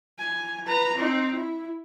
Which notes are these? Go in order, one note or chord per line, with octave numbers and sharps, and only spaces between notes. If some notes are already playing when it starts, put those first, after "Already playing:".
G#5
B4 A#5
C4 D#4
E4